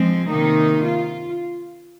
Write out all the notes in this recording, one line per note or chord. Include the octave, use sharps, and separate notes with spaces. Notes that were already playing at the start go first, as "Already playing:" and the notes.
Already playing: F3 G#3 C4
C3 D#3 A#3 D#4
F4